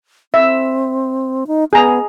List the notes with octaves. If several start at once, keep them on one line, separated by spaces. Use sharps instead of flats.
C4 E5
D#4
B3 G#4 A#5